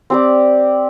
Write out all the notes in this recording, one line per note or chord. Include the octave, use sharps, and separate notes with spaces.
C4 G4 D5